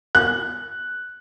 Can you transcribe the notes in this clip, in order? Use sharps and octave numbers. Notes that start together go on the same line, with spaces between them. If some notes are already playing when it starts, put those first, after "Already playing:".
F#6